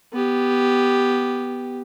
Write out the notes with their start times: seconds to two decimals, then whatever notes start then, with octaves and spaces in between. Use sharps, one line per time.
0.13 B3 G4